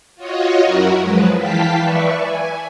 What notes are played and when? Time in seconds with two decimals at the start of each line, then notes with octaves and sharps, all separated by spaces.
0.16 F4 F#4 C#5 D#5
0.63 F#2 E4 F#4 A#4
1.01 F3 F#3 G#3 B4
1.36 E3 F5 G5 A5 B6
1.77 B4 D5 E5 C#6
2.16 G#5